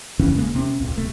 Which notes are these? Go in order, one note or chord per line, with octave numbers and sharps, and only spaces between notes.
F#2 C#3 E3 C#4
D#1 G#3 A#3
C3 C4 C#4
C#2 A#2
D1 C3 A3